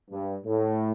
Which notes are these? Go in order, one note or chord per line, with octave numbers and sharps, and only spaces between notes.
G2
A2